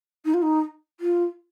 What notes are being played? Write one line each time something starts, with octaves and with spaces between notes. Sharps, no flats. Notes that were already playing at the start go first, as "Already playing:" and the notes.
D#4
F4
D#4
F4